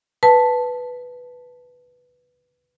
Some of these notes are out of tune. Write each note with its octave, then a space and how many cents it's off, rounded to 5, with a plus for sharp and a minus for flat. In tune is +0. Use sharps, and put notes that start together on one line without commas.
B4 +0 A5 +0